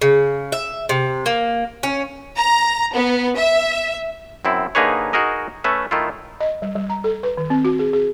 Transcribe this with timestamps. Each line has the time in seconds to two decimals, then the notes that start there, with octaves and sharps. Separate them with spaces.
0.02 C#3
0.52 E5
0.89 C3
1.26 A#3
1.83 C#4
2.37 A#5
2.93 B3
3.37 E5
4.45 F#2 C4 E4
4.75 D3 A#3 D#4 G#4 B4 C#5
5.13 D#4 F#4 G#4 A#4 D#5
5.64 A3 C#4 B4 E5
5.91 D#3 A3 E4 F4
6.40 D#5
6.62 G3
6.76 G3
6.90 A#5
7.04 A4
7.23 B4
7.37 D#3
7.50 C4
7.65 F#4
7.79 G#4
7.93 G#4